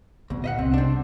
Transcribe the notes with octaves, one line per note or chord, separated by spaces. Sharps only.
D2 A#2 B3
D#5 E5 F#5
C2 C3 C4
C4 D4